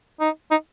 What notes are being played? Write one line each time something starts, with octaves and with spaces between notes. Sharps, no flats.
D#4
D#4